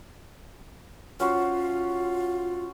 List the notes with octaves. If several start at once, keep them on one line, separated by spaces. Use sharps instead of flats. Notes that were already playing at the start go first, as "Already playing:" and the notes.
C#4 F4 F#4 C5